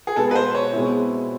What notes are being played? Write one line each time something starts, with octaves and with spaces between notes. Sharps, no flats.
G#4
B2 G#3 B3 A4
B4
C5
C#5
B2 G#3 C4 E4